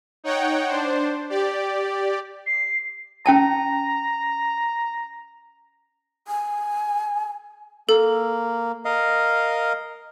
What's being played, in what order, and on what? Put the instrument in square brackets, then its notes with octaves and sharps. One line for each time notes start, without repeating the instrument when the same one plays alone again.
[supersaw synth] D#4 C#5 F#5 G5
D4 C5
G4 D5
[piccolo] C7
[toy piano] C#4 G5 A5 [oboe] A#5
[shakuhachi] G#5
[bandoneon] A#3 [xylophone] A4
[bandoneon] A#4 D#5 F5